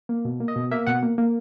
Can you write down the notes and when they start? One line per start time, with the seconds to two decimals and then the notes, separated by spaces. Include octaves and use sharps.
0.09 A#3
0.25 B2
0.40 A#3
0.48 D#5
0.56 B2
0.71 A#3 E5
0.87 B2 F#5
1.03 A#3
1.18 A#3